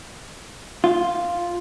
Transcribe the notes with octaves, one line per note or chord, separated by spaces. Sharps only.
F4